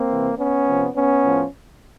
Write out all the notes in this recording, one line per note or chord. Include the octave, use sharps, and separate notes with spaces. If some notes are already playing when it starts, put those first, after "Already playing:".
Already playing: A#3 C4
C3 E3
B3 C#4
C3 F3
B3 C#4
A2 F3